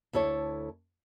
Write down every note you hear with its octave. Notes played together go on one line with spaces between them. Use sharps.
D2 E4 A4 C#5